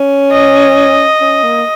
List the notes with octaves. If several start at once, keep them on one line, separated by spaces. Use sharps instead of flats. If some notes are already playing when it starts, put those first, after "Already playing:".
Already playing: C#4
D#5
C#4
A#3